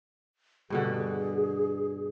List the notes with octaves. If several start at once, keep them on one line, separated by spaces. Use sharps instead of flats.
G2 B2 D3 G#4